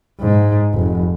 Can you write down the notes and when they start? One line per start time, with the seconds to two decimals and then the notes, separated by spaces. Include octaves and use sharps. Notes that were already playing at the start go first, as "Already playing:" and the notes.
0.20 G#2
0.74 F1